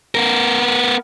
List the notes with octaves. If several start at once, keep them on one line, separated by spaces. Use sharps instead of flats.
B3 A#4